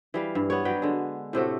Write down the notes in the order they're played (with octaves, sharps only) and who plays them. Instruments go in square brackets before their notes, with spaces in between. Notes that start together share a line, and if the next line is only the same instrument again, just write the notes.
[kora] E3 G3 F5
G2
B3 C#5
F#3 G3 B4 G5
D3 G#3
A2 C3 A3 F#4